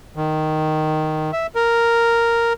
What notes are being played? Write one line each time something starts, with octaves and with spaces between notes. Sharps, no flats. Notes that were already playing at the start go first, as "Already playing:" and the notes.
D#3
E5
A#4